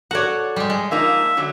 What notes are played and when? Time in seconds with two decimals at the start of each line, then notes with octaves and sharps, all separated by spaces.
0.11 F#4 A4 C#5 D5 F#5
0.56 G3 G#3
0.70 G#3
0.91 F3 A#3 D#4 E5
1.37 D3 F#3